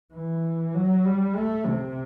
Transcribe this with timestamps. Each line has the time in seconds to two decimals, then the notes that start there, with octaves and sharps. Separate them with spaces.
0.14 E3
0.75 F#3
1.05 G3
1.36 A3
1.67 C3